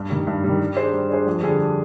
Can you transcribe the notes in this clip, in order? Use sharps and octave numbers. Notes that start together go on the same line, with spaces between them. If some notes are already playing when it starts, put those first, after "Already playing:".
Already playing: G2
D#3 G3
G2
D#3 G3
G3
D4 G#4 C5
G3
D4 G#4 C5
F2
D3 G3 D4 G#4